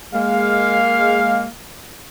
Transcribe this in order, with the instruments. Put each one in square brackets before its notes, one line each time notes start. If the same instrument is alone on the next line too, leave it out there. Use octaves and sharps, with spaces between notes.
[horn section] G#3 A#3 F5